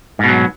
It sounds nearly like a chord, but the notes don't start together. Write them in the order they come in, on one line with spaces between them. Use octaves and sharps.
G#2 B2 F#3